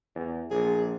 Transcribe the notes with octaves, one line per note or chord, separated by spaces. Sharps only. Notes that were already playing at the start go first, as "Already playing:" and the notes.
E2
A#1 G#4